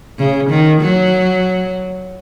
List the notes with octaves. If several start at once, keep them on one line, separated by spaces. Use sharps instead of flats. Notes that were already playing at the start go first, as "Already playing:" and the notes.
C#3
D#3
F#3